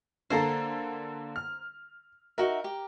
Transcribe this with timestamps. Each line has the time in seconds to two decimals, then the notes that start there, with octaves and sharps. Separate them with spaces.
0.30 D3 A#3 A4 C5 A#5
1.36 F6
2.38 D#4 F#4 A#4 E5
2.64 G4